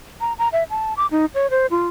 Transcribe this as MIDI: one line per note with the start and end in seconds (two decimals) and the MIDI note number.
0.21 0.33 82
0.39 0.48 82
0.52 0.64 76
0.70 0.94 81
0.97 1.07 86
1.11 1.26 63
1.35 1.50 73
1.50 1.66 72
1.70 1.88 65